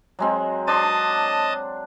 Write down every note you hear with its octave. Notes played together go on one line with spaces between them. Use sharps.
F#3 G#3 C4
D4 C5 D#5 A5 D#6